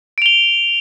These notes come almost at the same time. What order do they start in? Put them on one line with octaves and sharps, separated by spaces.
D7 F7 G7